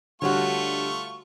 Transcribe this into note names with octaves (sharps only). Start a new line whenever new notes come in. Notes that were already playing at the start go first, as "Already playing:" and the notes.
D3 G3 A3 F4 F#4 C#5 C#6